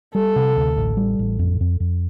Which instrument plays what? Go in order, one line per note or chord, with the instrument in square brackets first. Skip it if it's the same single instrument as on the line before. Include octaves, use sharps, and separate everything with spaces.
[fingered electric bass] G3 [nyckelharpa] A4
[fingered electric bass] C3
D2
A1
G3
A1
F2
F2
F2